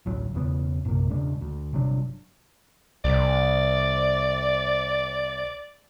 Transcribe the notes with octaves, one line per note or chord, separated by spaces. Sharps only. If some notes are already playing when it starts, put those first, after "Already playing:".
A1 D2 F#3
E1 E2 C#3 B3
A#1 F#2 C3 A#3
E1 C#3 G#3 D4
D2
G1 C3 F#3 D4
C2 D5